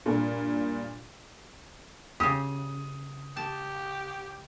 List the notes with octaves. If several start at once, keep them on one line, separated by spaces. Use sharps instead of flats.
G2 A#2
C#3 G4 D#6
G4 A5